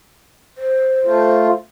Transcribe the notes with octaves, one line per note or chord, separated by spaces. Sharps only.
C5
A3 F4